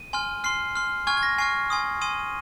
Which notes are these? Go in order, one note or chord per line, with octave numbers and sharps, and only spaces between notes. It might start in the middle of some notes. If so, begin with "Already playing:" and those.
Already playing: D#7
G#5 C6 F6
C6 F6 C7
C6 F6
G#5 C#6 F6 G#6
G#6
A#6
G#5 C#6 F6 C7
G#5 C6 D#6
G#5 C6 D#6 D#7